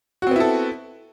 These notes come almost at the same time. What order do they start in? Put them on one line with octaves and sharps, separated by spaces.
F#4 C4 B3 E4 A4